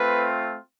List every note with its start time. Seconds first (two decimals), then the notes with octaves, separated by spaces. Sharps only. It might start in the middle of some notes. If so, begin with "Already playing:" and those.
Already playing: A3 C4 F4 B4